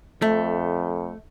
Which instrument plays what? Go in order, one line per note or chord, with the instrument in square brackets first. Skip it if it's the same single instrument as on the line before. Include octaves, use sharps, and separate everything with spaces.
[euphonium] F2 [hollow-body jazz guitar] A3